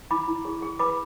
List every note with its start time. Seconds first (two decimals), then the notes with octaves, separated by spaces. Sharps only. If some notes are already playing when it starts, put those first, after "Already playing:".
0.11 E4 B5 D6
0.28 E4
0.45 G#4
0.62 G#4
0.79 B4 B5 D6